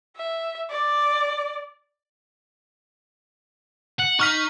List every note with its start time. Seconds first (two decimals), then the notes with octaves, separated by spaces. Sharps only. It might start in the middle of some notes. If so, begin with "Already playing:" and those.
0.17 E5
0.70 D5
4.00 F#5
4.20 D#4 C#6 F6 B6